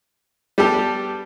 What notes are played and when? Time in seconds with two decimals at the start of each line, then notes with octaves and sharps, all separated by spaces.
0.58 G3 B3 D4 G4 A4